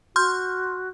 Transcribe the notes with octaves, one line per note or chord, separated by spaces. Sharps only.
F#4 C6 F6 G6